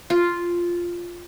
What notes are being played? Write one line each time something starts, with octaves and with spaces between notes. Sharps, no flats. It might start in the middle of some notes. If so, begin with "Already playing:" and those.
F4